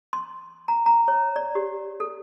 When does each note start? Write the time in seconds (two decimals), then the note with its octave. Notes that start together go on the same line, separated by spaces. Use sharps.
0.13 C6
0.68 A#5
0.86 A#5
1.08 C#5
1.36 D5
1.55 G4
2.00 A4